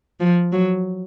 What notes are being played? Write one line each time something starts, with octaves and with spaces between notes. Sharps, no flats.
F3
F#3